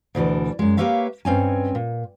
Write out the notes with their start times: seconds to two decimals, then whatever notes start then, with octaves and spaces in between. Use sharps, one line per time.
0.15 D2 B2 E3 D4
0.59 F#2 G#3
0.77 A#3 G4 B4 C#5 E5 F5
1.25 G2 C4 C#4 G#5
1.75 A#2